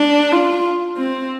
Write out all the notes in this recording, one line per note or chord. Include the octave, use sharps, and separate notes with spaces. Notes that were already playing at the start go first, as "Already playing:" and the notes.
Already playing: D4
F4
C4